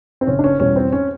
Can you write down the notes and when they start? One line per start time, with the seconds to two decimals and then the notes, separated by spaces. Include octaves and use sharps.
0.21 C4
0.27 F#1 C#4
0.39 D4
0.44 C#4
0.60 E2 B2 G3 C#4
0.76 C4
0.93 C#4